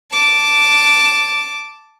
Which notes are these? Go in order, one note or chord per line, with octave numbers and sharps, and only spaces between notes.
A5 D6